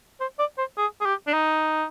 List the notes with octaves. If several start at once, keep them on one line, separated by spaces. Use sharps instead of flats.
C5
D5
C5
G#4
G#4
G4
D4
D#4